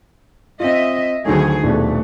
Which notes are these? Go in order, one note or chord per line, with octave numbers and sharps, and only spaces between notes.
C4 F4 D#5 E5
D2 D#3 F#3 A3 G#4
D#1 B2 A3 D4